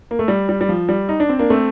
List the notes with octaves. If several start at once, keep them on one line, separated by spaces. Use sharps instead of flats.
A#3
A3
G3
G3
G3
F3
G3
D#4
D4
C4
A#3 D4
A3 C4